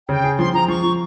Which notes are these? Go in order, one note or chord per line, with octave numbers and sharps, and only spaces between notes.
C#3 G5
G#4
F3 C6
F3 A#5
F3 C#6
F3